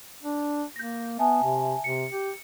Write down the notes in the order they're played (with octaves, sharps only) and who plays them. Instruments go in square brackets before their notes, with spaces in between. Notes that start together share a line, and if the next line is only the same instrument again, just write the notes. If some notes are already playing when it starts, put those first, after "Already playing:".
[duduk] D4
[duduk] A#3 [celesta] G6 A#6
[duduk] B3 [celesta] E5 G#5 A5
[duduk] C3
[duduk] C3 [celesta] C#7
[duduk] G4